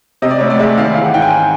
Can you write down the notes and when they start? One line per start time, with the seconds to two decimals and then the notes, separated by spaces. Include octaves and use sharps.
0.22 C3 D#5
0.31 D5
0.40 D2 C#5
0.50 D5
0.59 G#3 E5
0.77 D#3 F5
0.95 E3 F5
1.04 F#5
1.13 G#2 G5
1.22 G#5